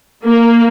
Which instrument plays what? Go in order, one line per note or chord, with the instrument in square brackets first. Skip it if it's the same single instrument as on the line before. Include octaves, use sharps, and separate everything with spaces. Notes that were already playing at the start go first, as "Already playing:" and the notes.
[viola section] A#3